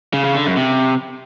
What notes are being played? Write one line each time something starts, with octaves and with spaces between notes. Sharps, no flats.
C#3
C#3
D3
F#2
C3